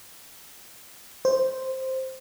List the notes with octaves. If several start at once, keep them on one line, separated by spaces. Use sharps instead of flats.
C5